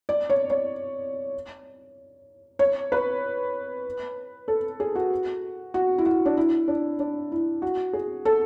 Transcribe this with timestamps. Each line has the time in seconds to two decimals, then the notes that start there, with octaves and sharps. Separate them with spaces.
0.09 D5
0.30 C#5
0.50 C#5
2.59 C#5
2.92 B4
4.48 A4
4.80 G#4
4.95 F#4
5.74 F#4
5.98 E4
6.06 F#4
6.26 D4
6.37 E4
6.68 D4
6.99 D4
7.32 E4
7.62 F#4
7.93 G#4
8.25 A4